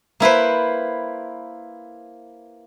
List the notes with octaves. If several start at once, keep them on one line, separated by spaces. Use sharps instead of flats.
A#3 E4 B4 C5